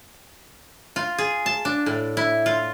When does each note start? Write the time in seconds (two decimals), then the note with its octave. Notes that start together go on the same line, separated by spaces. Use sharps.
0.96 F4
1.18 G#4
1.46 A5
1.65 D4
1.86 A2
2.17 E4
2.46 F4